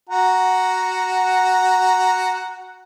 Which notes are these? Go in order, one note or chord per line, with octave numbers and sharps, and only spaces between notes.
F#4 F#5 A#5